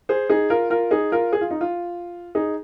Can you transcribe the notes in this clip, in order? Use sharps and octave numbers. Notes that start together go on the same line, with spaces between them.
G#4 C5
D#4 G#4
F4 A#4
F4 A#4
D#4 G#4
F4 A#4
G#4
F4
D#4
F4
D#4 G#4